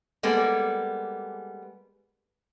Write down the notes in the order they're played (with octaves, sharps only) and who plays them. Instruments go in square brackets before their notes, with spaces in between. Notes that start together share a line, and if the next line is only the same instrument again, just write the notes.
[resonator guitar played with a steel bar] G3 G#3 A#3 B3 A4